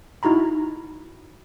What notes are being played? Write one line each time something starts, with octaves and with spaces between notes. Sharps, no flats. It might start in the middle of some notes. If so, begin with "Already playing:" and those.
D#4 E4 F#4 A#5 B5